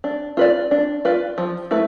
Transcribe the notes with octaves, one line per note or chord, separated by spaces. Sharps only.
D4
F4 B4 D5
D4
F4 B4 D5
F3
A3 E4 B4